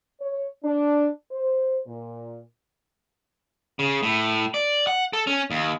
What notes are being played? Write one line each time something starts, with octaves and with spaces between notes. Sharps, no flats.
C#5
D4
C5
A#2
C#3
A2
D5
F#5
A4
C#4
D#2